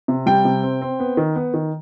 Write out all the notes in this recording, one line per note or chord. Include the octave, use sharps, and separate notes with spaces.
C3
G3 G5
C3
C4
C4
B3
D#3
B3
D#3